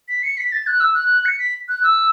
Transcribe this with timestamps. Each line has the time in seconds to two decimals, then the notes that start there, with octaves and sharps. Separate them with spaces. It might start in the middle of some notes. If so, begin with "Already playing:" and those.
0.09 B6
0.23 C#7
0.37 B6
0.52 A6
0.67 F#6
0.80 E6
0.94 F#6
1.25 C#7
1.39 B6
1.69 F#6
1.83 E6